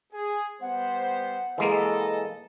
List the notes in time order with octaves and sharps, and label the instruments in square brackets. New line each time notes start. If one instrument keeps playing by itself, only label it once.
[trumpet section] G#4
[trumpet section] G3 B3 C5 [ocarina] F#5
[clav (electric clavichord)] E3 G#3 A#3 [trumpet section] A4 D#5